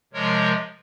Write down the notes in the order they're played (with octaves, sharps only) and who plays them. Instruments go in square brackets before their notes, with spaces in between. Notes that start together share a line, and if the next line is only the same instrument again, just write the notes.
[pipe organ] C3 F3 G#3 A#4 C#5